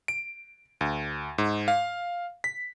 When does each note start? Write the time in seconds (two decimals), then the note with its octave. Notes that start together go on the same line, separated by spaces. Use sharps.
0.08 D7
0.81 D2
1.38 G#2
1.68 F5
2.44 B6